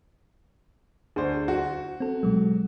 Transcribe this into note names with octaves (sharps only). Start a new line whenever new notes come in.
D2 G#4 C5 D5
F#4
C4 A4
B2 F#3 G#3